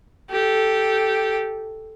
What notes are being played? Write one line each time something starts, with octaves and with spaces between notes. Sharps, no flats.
G4 A4